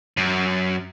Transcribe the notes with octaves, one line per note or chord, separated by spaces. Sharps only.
F#2